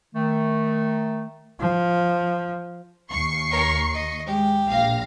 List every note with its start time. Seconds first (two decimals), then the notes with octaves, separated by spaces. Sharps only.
0.15 D#3 A3
1.59 F3
3.11 D#2 C#6 C7
3.51 A#4 C#5
3.93 D#5
4.27 G#3 G4
4.68 A#1 F5 A#6